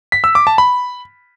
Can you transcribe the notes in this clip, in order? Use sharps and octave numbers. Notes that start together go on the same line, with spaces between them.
B6
E6
D6
A5
B5